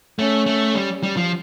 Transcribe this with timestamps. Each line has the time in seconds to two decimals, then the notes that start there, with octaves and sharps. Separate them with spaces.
0.18 A3 C#4
0.46 A3
0.74 G3
1.03 G3
1.17 F3